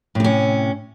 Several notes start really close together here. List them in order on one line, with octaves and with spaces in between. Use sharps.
A2 C3 C#4